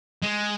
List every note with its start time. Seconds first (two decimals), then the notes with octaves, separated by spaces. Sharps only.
0.23 G#3